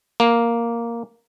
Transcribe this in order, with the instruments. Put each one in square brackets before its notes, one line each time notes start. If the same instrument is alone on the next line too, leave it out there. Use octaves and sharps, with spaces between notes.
[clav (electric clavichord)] A#3